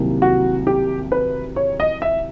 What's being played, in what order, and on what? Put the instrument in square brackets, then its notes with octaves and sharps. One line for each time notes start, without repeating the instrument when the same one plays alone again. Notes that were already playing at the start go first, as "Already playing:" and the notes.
Already playing: [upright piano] C2 C3 D#3 F#3 A#3
[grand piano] F#4
G4
B4
C#5
D#5
E5